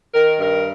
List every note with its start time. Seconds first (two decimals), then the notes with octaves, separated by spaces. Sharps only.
0.13 D#3 A#4
0.40 G2 A#4